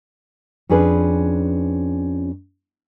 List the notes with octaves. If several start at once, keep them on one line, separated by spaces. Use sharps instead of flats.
F2 C#4 D4 G#4 B4